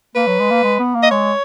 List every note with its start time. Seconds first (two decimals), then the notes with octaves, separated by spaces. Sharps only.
0.15 A#3 B4
0.27 F#3
0.40 G#3
0.51 A#3
0.63 G#3
0.79 B3
0.95 A#3
1.03 D#5
1.11 G#3 C#5